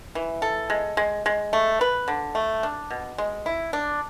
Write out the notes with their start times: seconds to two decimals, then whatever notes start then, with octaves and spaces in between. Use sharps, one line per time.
0.15 E3
0.42 A4
0.70 G#3
0.97 G#3
1.26 G#3
1.53 A3
1.81 B4
2.08 D3
2.35 A3
2.63 D4
2.90 B2
3.18 G#3
3.46 E4
3.73 D4